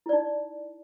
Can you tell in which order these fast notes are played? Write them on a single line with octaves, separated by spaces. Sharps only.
E4 D5 D#4